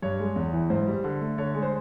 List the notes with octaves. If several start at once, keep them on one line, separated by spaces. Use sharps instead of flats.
G2 C#5
G#3
E2
E3
G#2 C5
G3
D3
A3
D3 C#5
G#3
C5